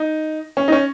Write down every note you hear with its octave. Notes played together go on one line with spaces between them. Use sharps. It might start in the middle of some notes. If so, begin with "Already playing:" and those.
Already playing: D#4
C#4
D#4
C#4